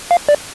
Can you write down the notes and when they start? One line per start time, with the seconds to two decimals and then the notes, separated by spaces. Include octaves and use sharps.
0.11 F5
0.29 D5